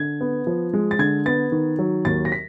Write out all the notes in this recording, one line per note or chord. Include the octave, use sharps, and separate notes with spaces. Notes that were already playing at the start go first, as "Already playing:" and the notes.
Already playing: D3 G#6
B3
F3
G#3
A6
D3 G#6
B3 A6
D#3
F#3
D#2 A6
A#6
B6